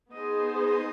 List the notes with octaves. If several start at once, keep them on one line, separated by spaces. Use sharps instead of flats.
B3 D#4 G#4 C5 D#5
D#5